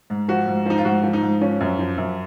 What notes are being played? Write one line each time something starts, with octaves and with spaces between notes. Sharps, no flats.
G#2
F3 F#4
G#2
F3 D#4
F4
G#2 F#4
F3
D#4
G#2
F3 C#4
F#2
F3
F#2